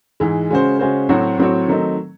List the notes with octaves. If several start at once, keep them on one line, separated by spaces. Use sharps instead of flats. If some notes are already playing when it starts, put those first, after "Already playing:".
G#2 E3 G#3
C#3 G#3 C#4 F#4 C5
C#3 G#3 C#4 F#4 C5
A2 F#3 C4 F#4 C#5
A2 F#3 C4 F#4 C#5
D#3 F#3 A3 C4 D#4